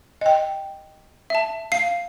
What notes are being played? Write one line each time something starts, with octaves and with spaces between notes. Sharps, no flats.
D#5 G5
E5 A5
F5 C7